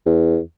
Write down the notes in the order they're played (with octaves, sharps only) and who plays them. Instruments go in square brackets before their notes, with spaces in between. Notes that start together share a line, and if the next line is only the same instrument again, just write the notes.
[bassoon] E2